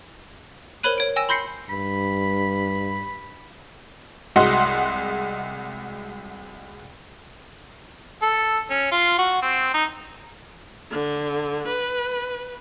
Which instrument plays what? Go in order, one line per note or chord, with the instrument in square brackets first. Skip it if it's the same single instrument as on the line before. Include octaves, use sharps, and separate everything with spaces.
[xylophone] A#4 C5 C#5 B5 F#6 D#7
C#5 D7
G5 G#5 E6 A#6 E7
B5 C6 G6 A#6 C7 C#7
[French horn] G2 [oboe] B5
[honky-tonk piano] C2 G#3 F#4 D#5 F#5 C6
[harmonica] A4
C#4
F4
F#4
C4
D#4
[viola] D3
B4